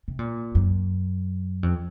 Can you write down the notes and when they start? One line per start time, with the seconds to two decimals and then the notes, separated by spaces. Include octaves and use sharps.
0.08 C3
0.19 A#2
0.55 F#2
1.63 F2